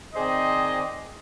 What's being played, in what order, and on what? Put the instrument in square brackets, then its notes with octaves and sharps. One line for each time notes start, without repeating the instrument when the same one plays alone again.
[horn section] D#3 C4 G#4 C5 D5 D#5